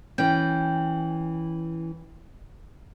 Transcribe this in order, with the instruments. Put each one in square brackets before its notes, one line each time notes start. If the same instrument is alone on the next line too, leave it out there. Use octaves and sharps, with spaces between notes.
[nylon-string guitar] E3 C#4 [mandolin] G5